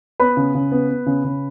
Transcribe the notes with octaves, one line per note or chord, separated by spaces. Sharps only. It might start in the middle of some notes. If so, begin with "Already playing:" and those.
B3 B4 B5
C#3
C#3
B3
B3
C#3
C#3